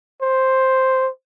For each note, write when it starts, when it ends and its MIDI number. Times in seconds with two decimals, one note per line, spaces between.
0.22 1.09 72